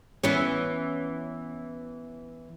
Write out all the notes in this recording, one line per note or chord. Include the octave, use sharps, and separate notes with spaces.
E3 B3 C#4